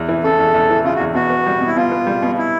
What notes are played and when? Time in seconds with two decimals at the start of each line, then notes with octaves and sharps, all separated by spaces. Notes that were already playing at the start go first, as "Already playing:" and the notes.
Already playing: E2
0.09 E3
0.23 C#3 A4
0.39 E2
0.54 E2
0.70 E3
0.84 C#3 F4
0.95 F#4
1.00 E2
1.15 B2 F#4
1.30 B3
1.46 G3
1.61 B2
1.67 E4
1.76 B2 F4
1.91 B3
2.07 G3
2.22 B2
2.38 E4